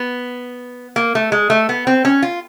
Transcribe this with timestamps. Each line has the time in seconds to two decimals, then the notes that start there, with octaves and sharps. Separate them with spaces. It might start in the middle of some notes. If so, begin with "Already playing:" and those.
Already playing: B3
0.96 A#3
1.15 A3
1.32 G#3
1.50 A3
1.69 B3
1.87 C4
2.05 C#4
2.22 F4